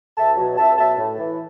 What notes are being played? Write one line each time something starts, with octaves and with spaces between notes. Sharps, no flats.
C#2 E5 A5
B2 F#3
C#2 E5 A5
B2 F#3 E5 A5
A2
E3